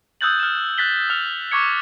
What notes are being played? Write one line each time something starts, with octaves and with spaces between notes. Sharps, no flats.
D#6 E6 F#6 G6 A6 F#7
F6 E7
F#6 A6 B6 G7
D#6 F6 G6 F7
C#6 D6 G#6 C#7